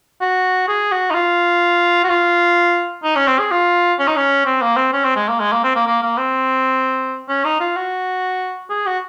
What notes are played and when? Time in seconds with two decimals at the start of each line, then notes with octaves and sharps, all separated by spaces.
0.21 F#4
0.68 G#4
0.92 F#4
1.11 D#4
1.15 F4
2.04 F#4
2.10 F4
3.04 D#4
3.16 C#4
3.27 C4
3.39 G#4
3.52 F4
3.99 C#4
4.08 D#4
4.17 C#4
4.46 C4
4.62 A#3
4.77 C4
4.93 C#4
5.05 C4
5.16 G#3
5.29 A#3
5.40 G#3
5.52 A#3
5.64 C4
5.76 A#3
5.88 A#3
6.03 A#3
6.18 C4
7.29 C#4
7.45 D#4
7.60 F4
7.77 F#4
8.70 G#4
8.87 F#4